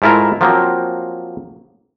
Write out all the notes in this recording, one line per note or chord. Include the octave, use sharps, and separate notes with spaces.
G#2 A3 E4 F4 A#4 A#5
F3 F#3 A#3 C4